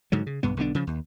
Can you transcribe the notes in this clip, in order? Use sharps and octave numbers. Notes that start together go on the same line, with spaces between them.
G#2 D3 F#3
C#3
B1 G2 B3
B1 D3 B3 D4
C#3 F3
D#2